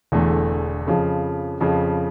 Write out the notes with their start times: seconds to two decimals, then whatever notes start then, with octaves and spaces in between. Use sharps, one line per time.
0.12 E1 E2 D3 A3
0.87 F2 C#3 F3
1.61 F2 C#3 F3